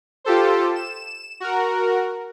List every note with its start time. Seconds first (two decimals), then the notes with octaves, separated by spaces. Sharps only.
0.24 F4 G4 A4 C5
0.76 E7
1.40 F#4 A#4